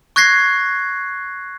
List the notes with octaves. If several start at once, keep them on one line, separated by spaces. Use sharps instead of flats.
C#6 F#6 G#6 A#6 C7